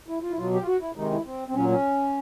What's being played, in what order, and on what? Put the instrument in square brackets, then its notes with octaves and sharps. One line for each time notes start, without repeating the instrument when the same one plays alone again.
[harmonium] E4
F4
E4
B2 F#3 F4
G4
F4
F#4
E4
C3 D#3 G#3 D#4
E4
C4
C4
A#2 F#3 C#4
C#4